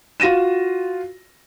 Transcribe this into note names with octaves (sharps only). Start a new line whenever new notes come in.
F4 F#4 A#6 D#7 E7